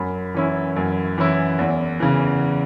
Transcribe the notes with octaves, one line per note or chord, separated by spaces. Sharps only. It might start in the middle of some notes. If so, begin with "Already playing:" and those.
Already playing: F#2 B5
E3 C#4 E4
F#2
E3 C#4 E4
E2
C#3 E3